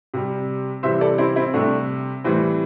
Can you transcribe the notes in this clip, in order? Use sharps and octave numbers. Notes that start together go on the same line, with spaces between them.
C3 G3
C3 E3 G3 C5 E5
A4 D5
C4 E4
C4 E4
C3 G3 A3 D4
A2 E3 G3 C4